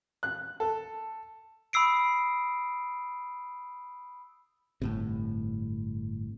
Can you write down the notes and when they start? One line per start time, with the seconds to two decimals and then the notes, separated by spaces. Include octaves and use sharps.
0.23 F#6
0.60 A4
1.73 B5 D#6 E6 C7 D7
4.82 G1 A2 C3